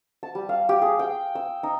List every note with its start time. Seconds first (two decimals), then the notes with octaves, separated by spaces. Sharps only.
0.23 A5
0.35 G3
0.49 F5
0.69 G4
0.82 G#4
0.99 G5
1.35 E6
1.63 D#4